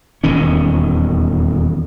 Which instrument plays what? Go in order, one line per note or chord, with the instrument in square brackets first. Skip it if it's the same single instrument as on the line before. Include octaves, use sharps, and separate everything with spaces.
[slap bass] D#1 E2 D#3 C#4